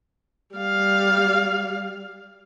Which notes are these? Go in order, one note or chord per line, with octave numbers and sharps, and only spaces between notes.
G3 F5